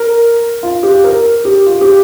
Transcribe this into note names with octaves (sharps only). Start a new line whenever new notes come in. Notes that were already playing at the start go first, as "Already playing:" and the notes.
Already playing: A#4
F4
G4
A#4
G4
F4
G4